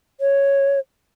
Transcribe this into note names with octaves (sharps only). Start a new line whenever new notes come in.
C#5